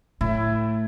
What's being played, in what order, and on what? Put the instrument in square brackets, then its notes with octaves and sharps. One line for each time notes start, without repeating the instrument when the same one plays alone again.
[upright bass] A2 [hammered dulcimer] E4